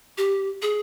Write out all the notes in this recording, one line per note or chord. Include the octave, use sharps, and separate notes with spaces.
G4
G#4